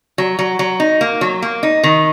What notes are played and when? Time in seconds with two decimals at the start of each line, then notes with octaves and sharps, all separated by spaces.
0.18 F#3
0.39 F#3
0.59 F#3
0.80 D#4
1.01 A#3
1.21 F#3
1.42 A#3
1.63 D#4
1.84 D#3